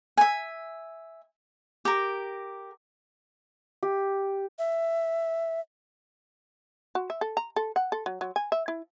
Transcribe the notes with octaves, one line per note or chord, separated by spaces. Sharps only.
E5 G#5
G4 A#4
G4
E5
F#4
E5
A4
A#5
A4
F#5
A4
F#3
F#3
G#5
E5
E4